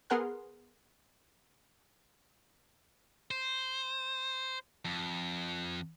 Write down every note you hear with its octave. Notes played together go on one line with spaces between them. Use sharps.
B3 G#4 A#4 F#5 C6 F6
C5
F2